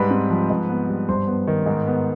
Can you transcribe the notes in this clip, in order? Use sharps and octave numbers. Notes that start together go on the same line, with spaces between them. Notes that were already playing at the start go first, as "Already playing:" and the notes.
Already playing: G#2 G3 B4 B5
C4
F3
G#2
B3
G3
G2 C5 C6
B3
D#3
G#2
B3